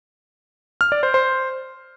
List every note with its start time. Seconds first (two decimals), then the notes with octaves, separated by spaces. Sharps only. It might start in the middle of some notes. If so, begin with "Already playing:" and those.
0.81 F6
0.92 D5
1.03 C5
1.14 C5